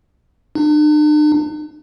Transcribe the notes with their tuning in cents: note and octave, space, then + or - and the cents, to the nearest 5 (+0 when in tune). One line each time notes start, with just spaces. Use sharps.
D4 +45